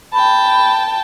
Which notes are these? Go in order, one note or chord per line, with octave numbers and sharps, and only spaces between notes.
G5 A5 B5